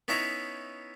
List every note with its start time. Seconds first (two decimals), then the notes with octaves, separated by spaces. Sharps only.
0.08 B3 C#4 D#4 E4 C#5 A#5